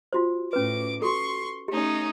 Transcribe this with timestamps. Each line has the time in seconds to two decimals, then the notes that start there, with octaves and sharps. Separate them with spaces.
0.13 F4 F#4 C5
0.53 A2 C#4 B4 D6
1.02 F#4 A4 C6 C#6
1.68 A3 C#4 D#4 G4